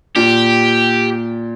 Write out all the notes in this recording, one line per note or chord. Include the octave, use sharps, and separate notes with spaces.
A#2 G4